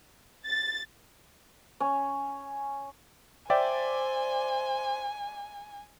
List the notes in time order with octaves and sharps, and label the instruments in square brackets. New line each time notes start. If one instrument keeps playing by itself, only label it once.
[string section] A6
[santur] C#4
[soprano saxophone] C5 [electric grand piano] D5 E5 [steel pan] G5 [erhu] G#5